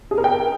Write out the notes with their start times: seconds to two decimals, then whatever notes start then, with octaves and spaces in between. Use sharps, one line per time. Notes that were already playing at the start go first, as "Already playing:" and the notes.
0.11 G#4
0.18 A#4
0.24 G5